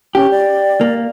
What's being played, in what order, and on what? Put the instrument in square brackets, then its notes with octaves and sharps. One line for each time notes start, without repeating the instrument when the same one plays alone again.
[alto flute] C#4 [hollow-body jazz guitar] G4
[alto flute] D5
[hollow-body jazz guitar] A#3